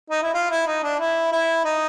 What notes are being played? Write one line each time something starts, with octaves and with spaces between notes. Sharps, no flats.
D#4
E4
F4
E4
D#4
D4
E4
E4
D#4